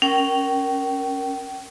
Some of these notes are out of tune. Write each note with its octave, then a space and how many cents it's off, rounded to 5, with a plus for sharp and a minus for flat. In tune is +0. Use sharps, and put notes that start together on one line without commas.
C#4 +0 A#4 +0 G5 -30